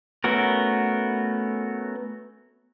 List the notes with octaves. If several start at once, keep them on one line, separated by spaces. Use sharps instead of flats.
A3 B3 C#4 F#4 A#4